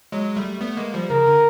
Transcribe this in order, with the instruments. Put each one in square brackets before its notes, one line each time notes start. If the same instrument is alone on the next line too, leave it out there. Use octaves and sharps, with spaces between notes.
[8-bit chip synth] F#3 G#3
G3 A3
A3 B3
G#3 A#3
F3 G3
[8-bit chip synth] C#3 [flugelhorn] A#4
[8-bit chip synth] D3